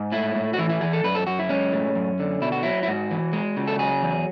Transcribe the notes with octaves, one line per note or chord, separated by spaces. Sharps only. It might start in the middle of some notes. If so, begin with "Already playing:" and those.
Already playing: G#2
A2 E4
A2
F#4
E3 E4
E4
E3 G#4
A4
F#2 B4
A4
F#2 F#4
E4
G#3 C#4
A2
F#2
D3
B2 E4
F#4
F#3 E4
E4
G#2 F#4
E3
G#3
C#3
A4
F#3 G#4
E2